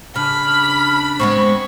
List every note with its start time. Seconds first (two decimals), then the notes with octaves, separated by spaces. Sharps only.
0.16 C#3 D4 B5 F6
1.19 G#3 B3 C4 C#6